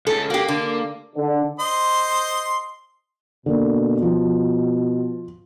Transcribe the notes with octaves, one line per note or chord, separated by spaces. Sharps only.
C#2 C#3 A4
A#3 F#4 G4
D3
D3
C5 D#5 C6
B2 D3 A#3
F3